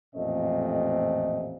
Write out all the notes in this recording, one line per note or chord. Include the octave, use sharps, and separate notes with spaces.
A1 F2 A#2 A3 C4 D#5